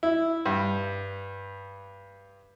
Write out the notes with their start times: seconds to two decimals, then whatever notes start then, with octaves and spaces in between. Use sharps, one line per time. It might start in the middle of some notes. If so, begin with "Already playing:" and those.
0.03 E4
0.46 G2